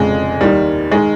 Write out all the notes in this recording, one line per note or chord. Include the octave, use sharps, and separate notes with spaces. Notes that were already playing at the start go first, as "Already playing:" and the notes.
Already playing: F1 F2 C#3 G#3
D#2 D#3 G3
D#3 G#3